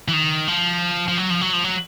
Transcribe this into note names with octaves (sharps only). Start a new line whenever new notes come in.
E3
D#3
F3
F3
F#3
F3
F#3
F3
F#3